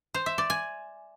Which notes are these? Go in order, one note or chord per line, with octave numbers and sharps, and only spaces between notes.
C5
E5
D5
G#5